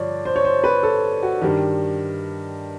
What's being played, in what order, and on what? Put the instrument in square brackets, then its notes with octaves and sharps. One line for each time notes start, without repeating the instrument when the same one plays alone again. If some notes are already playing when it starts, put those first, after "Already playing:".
Already playing: [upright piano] G2 D3 F3 C#5 D5
C5
C#5
C5
B4
A4
F#4
G2 D#3 G4